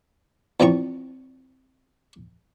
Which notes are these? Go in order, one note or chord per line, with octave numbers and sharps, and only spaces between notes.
E2 F3 C4 A#5 C#6